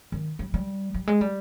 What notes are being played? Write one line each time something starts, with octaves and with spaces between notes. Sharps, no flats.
D#3
G3
G3
G3
G#3
G3